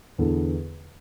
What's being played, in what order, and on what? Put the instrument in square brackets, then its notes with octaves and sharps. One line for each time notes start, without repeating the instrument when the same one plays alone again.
[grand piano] E2 D3 B3 E4 A4